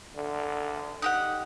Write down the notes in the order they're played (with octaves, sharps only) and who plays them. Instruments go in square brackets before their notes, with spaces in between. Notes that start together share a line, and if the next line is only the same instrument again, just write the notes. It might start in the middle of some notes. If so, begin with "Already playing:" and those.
[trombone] D3
[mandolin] D#4 G4 F#5